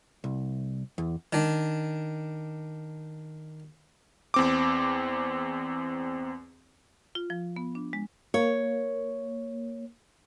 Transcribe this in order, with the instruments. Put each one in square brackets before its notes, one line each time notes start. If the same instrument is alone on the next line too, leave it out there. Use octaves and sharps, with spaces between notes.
[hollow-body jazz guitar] C2
E2
[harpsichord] D#3 D4
[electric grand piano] E2 C4 D6
[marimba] F4
F3
B3
D4
G#3
[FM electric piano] A#3 [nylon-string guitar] C#5